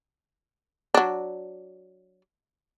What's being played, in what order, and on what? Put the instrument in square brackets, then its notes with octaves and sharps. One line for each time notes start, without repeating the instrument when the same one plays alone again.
[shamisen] F#3 D4